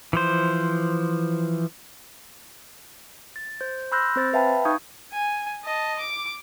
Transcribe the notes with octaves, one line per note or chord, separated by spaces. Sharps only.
E3 F3 C5
A6
C5 G6
B5 C6 E6 F#6 G6 A#6
C4 C5 A6
B4 E5 F5 G5 A5 B5
D#4 F5 C#6 D#6 G6 G#6
G#5
D#5 A5
D6